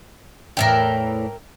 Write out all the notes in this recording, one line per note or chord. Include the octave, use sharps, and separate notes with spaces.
E2 A2 E3 A#4 E5 G5